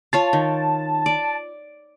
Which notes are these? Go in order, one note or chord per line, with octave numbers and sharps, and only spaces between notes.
F4 C#5 F5 A5
D#3
D5